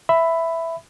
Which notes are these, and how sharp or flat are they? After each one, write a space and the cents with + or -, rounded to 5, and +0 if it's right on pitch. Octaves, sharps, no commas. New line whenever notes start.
E5 +0 B5 +10